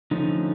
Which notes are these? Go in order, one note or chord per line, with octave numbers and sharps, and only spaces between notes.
D3 F3 A3 C#4 D#4